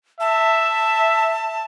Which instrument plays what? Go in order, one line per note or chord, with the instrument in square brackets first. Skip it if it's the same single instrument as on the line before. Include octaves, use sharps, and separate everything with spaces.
[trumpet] E5 [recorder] A5